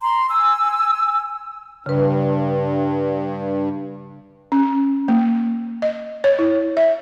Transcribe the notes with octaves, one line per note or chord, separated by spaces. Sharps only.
A#5 C6
G#5 E6
G2 C#3 B4
C#4
A#3
D#5
C#5
E4
E5